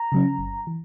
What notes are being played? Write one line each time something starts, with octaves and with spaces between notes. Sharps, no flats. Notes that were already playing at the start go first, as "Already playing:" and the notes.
Already playing: A#5
C#3 F#3 C#4
G1
E3